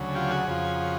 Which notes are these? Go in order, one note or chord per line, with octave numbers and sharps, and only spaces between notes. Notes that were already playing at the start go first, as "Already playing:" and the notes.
Already playing: D2 C#3 F#3
F4 G4
F#4 G#4
F2 C#3 F3